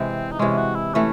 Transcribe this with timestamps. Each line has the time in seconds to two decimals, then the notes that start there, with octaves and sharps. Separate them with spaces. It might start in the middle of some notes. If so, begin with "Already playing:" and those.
Already playing: C3 E3 G#3 C4
0.32 D#4
0.39 C3 E3 G#3 C#4
0.57 F#4
0.75 E4
0.94 E3 A3 C#4